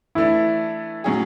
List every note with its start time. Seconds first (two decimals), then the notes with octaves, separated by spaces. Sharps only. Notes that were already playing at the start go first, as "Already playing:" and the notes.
0.15 E3 A3 D4 E4
1.04 A2 F#3 C#4 G#4